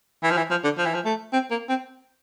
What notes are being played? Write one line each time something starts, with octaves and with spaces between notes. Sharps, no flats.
E3
F3
E3
F3
D3
F3
E3
F3
A3
C4
A#3
C4